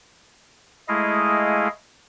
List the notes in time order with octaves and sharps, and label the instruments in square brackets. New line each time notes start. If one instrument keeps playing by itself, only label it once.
[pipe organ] G#3 A3 E4 G#4 D#5 F5